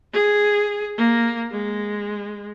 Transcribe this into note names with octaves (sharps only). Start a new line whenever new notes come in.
G#4
A#3
G#3